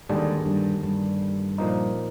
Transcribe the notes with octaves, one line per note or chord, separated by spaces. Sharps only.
D#2 G#2 D3 G3 D4 G#4
G2
G2
A#2 F3 A#3 D#4